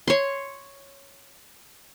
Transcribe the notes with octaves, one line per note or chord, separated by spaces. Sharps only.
C#5 C6